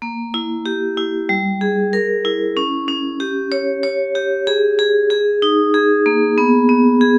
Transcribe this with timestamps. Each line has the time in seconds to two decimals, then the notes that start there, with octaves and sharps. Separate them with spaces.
0.02 A#3
0.34 E4
0.66 G4
0.97 E4
1.29 G3
1.61 G#4
1.93 A#4
2.25 E4
2.57 C#4
2.88 C#4
3.20 G4
3.52 C#5
3.83 C#5
4.15 G4
4.47 G#4
4.79 G#4
5.10 G#4
5.42 D#4
5.74 G#4
6.06 A#3
6.38 B3
6.69 B3
7.01 G#4